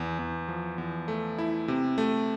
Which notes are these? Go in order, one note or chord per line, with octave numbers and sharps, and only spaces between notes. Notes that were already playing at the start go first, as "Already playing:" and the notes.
Already playing: E2
E2
F3
E2
A3
E4
C3
A3